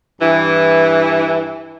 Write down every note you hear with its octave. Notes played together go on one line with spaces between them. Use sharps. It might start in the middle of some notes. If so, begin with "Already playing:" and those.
G2 E3